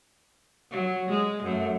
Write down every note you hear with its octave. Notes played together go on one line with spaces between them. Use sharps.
F#3
G#3
F#2 A3